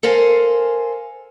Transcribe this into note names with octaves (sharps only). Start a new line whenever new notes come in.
A4 A#4 C5 F5 G#5